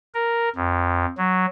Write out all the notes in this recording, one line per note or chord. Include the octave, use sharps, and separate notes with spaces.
A#4
F2
F#3